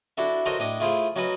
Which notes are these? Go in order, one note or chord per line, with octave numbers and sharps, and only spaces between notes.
D4 E4 F#4 A4 E5
F#4 A4 A#4 C5 C#5 D#5
A2 D4 D#5
A3 E4 F4 G#4 C5
F#3 C#4 D#4 F#4 B4